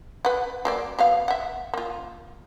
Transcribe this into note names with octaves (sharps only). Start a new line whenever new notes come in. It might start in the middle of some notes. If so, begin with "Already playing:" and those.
B4 F#5
F#3 A#3 D5
F#3 B3 F5
E5 F#5
A#3 F4